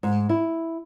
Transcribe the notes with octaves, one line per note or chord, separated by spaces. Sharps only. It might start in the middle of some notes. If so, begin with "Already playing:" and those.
G#2
E4